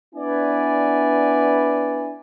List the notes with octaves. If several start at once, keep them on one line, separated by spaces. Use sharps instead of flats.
B3 D4 E4 B4 D5 G#5